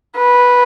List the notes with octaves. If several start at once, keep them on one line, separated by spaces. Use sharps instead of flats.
B4